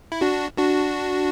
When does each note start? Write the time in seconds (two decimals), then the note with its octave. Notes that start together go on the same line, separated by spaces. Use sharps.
0.12 E4
0.21 D4 F#4
0.58 D4 F#4